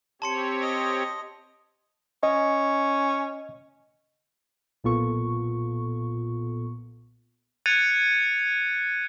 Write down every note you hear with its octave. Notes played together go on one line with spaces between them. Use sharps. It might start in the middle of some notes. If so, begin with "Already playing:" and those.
C4 G4 C#5 A5 C6 C#7
D#5
C#4 D#5
B1 A#2 B3 F4 A4 C#6
F#6 G#6 A6 C#7 D#7 F7